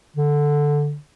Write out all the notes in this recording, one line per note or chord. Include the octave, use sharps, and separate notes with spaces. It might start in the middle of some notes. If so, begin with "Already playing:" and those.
D3